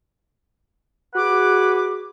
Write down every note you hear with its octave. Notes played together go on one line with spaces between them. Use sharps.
F#4 G#4 B4 F#5 D6